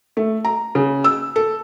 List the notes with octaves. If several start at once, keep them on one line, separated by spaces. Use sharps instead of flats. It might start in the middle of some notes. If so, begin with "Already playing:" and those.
A3
A#5
C#3
E6
A4